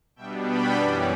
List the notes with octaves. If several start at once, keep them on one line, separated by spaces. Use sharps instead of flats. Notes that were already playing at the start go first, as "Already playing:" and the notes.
B2 G3 B3 D4 E5 G5
G5 B5
F#2 E3 G3 C#4